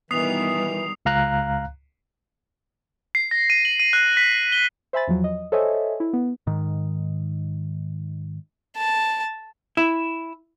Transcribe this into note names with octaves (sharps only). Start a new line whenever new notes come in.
B2 D#3 E3 G3 B3 D#6 C7 F7
C#2 F5 A#5 F#6
C7
A#6
D#7
F#7
D#7
F#6
B6
G7
C5 E5 G#5 B5 A6
E2 F3 F#3
D#5
A4 C5 C#5 D#5 E5 G#5
E4
B3
G#2 D#3
A5
E4